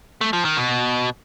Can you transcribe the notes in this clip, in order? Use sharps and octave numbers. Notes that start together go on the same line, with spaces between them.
A3
F3
D#3
B2